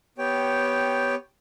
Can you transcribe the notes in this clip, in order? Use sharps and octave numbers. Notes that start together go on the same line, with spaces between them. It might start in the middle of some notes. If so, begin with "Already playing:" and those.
B3 G4 C#5 G5